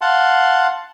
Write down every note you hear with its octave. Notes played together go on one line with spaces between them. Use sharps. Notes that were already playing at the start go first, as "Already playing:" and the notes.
F5 F#5 A5 C6